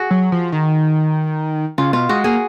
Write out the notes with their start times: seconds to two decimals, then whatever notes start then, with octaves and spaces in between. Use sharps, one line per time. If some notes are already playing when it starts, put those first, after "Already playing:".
Already playing: F#4 G#4
0.11 F#3
0.32 F3
0.52 D#3
1.78 C#3 F4
1.93 B2 F4
2.09 G#3 F#4
2.24 A#3 G#4